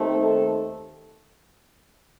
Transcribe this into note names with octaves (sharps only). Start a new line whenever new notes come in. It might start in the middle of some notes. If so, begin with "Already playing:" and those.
Already playing: D#2 D#3 A3 C4
A4